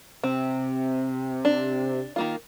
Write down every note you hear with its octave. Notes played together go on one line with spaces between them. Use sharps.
C3 C4
D4
D#3 A#3 F4